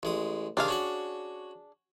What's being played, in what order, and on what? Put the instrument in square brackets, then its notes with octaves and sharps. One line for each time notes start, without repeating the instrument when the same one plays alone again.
[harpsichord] A1 G#3 D#6
[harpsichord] C3 D#3 D#6 [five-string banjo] D4 G#4 F5
[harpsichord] C#4 F#4 F#5